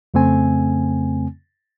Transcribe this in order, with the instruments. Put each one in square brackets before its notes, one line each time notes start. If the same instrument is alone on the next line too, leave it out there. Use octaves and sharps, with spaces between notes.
[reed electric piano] F2 C#3 A3 C4 G#5